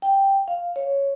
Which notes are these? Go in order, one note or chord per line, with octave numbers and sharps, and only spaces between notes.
G5
F5
C#5